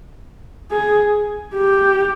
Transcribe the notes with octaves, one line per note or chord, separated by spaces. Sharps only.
G#4
G4